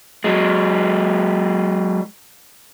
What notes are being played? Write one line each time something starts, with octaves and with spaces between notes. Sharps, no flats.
F#3 G#3